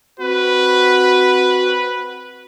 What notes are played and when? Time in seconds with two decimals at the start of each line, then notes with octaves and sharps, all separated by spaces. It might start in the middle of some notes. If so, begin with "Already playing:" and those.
0.20 C4 F#4 B4